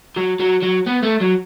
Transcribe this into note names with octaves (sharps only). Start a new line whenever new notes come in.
F#3
F#3
F#3
B3
A3
F#3